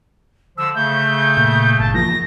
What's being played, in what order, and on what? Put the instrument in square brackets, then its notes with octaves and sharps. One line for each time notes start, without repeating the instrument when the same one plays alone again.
[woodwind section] D3 F3 [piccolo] E6
[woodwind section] C#3 A3 [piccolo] G6
[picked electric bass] A#2
[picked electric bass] G1 [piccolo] A5
[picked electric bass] E3 F3 A#3 [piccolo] A#6